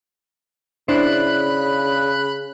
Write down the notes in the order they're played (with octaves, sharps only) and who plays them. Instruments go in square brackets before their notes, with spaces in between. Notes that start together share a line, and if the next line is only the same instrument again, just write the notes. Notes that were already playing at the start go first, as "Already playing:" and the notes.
[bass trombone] C#3 [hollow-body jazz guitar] D4 E4 C5 [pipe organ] B5 F#6